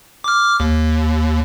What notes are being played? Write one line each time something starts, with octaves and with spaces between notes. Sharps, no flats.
D6 F6
D#2